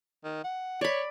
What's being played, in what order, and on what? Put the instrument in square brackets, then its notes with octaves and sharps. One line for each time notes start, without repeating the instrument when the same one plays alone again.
[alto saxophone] D#3
F#5
[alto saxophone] C#5 [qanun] D5 B5